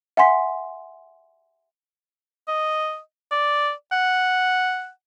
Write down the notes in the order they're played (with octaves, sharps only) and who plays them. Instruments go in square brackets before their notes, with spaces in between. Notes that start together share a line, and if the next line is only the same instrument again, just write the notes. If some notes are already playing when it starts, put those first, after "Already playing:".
[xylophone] E5 F#5 G#5 C6 B6
[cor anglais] D#5
D5
F#5